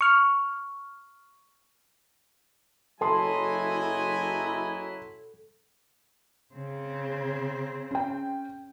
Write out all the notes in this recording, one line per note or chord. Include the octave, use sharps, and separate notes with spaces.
C#6 F6
F#1 F#3 E4 A4 D#5 G#5 A5 C6
C#3 C4
C#4 G5